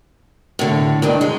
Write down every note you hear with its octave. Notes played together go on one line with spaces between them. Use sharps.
A2 D3
G2 D#3 D4
G#3